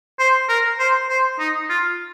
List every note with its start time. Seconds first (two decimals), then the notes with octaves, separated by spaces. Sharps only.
0.19 C5
0.49 A#4
0.79 C5
1.09 C5
1.39 D#4
1.69 F4